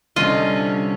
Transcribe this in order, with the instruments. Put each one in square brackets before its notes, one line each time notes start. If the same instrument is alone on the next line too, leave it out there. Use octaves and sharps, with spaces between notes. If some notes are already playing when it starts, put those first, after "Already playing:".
[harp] C2 [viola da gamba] D3 C#4 [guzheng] F4 [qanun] D#5